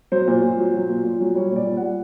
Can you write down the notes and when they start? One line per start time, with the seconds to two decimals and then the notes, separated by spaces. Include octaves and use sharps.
0.12 F#3 C5
0.27 A#2
0.43 A#2
0.58 F#3
0.73 F#3
0.89 A#2
1.05 A#2
1.20 F#3
1.35 G3 C#5
1.51 A#2 D5
1.67 A#2
1.77 F#5
1.82 G3